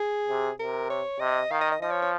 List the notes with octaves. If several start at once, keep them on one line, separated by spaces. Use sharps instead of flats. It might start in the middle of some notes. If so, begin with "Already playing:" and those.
Already playing: G#4
C3
C3 A#4
C#5
C3 D#5
D#3 F5
D#5
D#5
F3 D#5
C#5
C#5